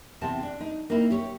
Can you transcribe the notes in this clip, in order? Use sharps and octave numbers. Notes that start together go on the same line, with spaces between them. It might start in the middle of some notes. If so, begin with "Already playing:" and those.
E2 C3 C4 A5
D4
D#4
A#3 C4 D#4 E4
G4 C#5